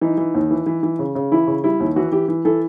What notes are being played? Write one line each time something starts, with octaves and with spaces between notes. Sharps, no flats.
E3 D#4
E3
D#2
E3
E3
E3
C#3
C#3
E3 E4
C#3
G3 E4
D#2
E3 F#4
E3 G4
E3
E3 A4